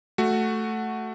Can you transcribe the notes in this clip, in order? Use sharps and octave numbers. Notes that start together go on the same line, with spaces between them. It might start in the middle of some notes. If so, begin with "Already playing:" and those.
A3 F#4